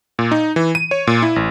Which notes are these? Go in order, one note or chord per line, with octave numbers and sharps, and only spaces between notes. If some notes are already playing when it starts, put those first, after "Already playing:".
A#2
D#4
E3
D#7
C#5
A#2
E4
A1